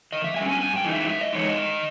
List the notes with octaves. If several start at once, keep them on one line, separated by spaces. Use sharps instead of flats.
D#3 D#5
E5
G3 C#4 G#5
G#5
G2 G#5
G5
E3 G#3 D#4
E5
G2 E5
D#5
E3 G#3 D#4 C#5
D#5
D#3